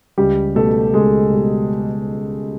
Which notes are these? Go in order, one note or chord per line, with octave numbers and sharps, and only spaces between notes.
C#2 G3 G4
B2 G3 A3 A4
C#2 G#3 G#4
B2 G3